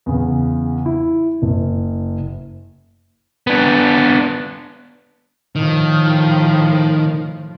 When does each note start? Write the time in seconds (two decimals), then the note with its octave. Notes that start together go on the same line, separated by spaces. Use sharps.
0.06 E2 C#3
0.86 E4
1.42 F#1
3.47 B3 D4
5.56 A2 D#3 F3